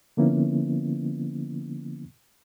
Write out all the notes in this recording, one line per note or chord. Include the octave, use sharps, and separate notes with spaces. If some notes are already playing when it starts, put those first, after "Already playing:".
D3 F3 A#3 B3 C#4 E4